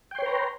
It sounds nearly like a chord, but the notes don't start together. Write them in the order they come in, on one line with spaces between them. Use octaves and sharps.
G5 C6 C#5 B4 A#5